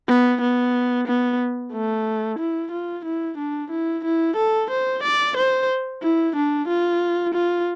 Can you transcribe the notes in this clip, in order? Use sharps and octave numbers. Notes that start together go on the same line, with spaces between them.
B3
B3
B3
A3
E4
F4
E4
D4
E4
E4
A4
C5
D5
C5
E4
D4
F4
F4